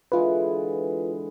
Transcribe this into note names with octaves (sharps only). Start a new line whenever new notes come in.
D3 E3 G#3 F4 B4